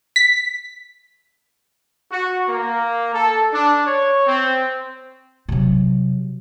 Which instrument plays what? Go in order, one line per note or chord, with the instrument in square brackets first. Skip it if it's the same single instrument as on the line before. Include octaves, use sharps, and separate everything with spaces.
[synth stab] B6
[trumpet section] F#4
A#3
A4
D4
C#5
C4
[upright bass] C3 F#3